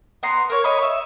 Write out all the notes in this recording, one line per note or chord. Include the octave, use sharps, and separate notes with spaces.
B3 A#5 C6
A#4 C#5
C#5 D#5 B5
E5 C#6